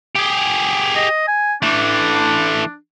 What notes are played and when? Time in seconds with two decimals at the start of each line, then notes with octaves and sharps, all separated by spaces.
0.16 G4 G#4
0.96 D#5
1.28 G#5
1.62 E3 A3 D4